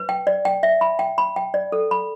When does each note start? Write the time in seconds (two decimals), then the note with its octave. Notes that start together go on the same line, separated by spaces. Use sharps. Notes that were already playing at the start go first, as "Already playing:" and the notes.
Already playing: B4
0.09 G5
0.27 D5
0.45 G5
0.63 E5
0.81 B5
0.99 G5
1.18 B5
1.36 G5
1.54 D5
1.72 A4
1.91 B5